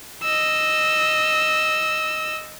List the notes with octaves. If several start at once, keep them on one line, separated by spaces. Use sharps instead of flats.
D#5 E6